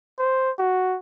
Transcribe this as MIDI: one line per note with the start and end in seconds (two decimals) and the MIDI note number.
0.19 0.51 72
0.59 0.98 66